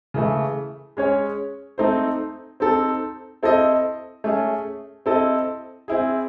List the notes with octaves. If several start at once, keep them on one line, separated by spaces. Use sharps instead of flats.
C#3 E3 A3
G#3 C#4 G#4 C#5
A3 C4 D#4 A4 C5
C4 D#4 A4
C4 E4 A4 C5 D#5
A3 C#4 G#4
C4 E4 A4 D#5
C4 E4 G#4